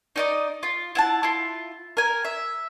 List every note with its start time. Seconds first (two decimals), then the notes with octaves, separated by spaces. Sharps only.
0.16 D#4 D5 D#5
0.63 F4
0.95 E4 F#5 A5
1.23 E4 F4
1.97 A#4 G#5
2.25 E5